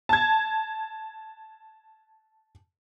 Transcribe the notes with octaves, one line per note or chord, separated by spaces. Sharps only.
A5 G#6